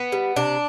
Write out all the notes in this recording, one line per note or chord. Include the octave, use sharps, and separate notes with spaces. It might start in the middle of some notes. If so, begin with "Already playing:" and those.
Already playing: B3
G3
C3 D4